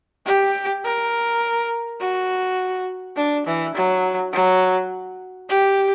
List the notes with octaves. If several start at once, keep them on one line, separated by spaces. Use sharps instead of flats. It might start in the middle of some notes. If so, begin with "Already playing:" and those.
G4
A#4
F#4
D4
E3
F#3
F#3
G4